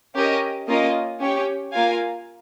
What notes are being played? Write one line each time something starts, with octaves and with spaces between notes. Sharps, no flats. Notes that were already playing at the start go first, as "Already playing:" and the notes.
C#4 G4 A#4 D#5
A#3 C#4 F4 A#4 D#5
C#4 G4 C#5 G5
A#3 F4 A#4 F5 G#5